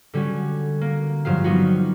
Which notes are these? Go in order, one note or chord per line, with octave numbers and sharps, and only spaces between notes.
D3 G3 C#4 F#4
A#3
G2 F3 F#3 F5
G3 B3 D#4 F#4